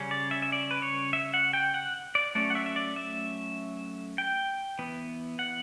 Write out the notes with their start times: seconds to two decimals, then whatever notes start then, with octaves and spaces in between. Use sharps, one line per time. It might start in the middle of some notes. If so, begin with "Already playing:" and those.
Already playing: C#3 G3 C#4
0.11 D5
0.31 E5
0.42 E5
0.52 D5
0.71 B4
0.82 C#5
1.13 E5
1.34 F#5
1.53 G5
1.74 F#5
2.15 D5
2.35 F#3 A3 C#4 D5
2.50 F#5
2.55 E5
2.66 E5
2.76 D5
2.96 E5
4.18 G5
4.79 E3 B3
5.39 F#5